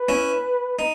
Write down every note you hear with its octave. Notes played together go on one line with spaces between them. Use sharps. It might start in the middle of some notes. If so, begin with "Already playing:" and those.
Already playing: B4
C#4 E4
D#4